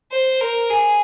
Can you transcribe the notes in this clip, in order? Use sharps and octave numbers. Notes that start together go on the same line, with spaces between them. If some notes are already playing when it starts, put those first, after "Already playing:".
C5
A#4
G#4